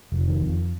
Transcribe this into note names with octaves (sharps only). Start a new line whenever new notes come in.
F1
D#3
F2